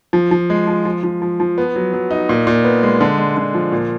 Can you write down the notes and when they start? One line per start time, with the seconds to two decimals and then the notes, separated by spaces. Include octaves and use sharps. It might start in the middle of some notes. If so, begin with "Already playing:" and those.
0.13 F3
0.31 F3
0.50 G#3
0.67 F3
0.85 F3
1.03 F3
1.22 F3
1.40 F3
1.58 B3
1.76 F#3
1.93 F#3
2.11 D#4
2.29 A#2
2.47 A#2
2.64 B3
2.83 G#3
3.01 D3
3.18 G#3
3.37 D3
3.54 F3
3.72 A#2